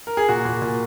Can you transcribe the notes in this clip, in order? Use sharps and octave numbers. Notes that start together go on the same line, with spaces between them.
A#4
G#4
A#2 F#4
A#2
A#2